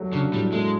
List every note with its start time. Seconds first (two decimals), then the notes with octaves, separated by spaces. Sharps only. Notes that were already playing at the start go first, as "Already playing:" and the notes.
Already playing: F#3 A3
0.12 C#3 D4
0.32 A2 G3
0.52 G#3 A3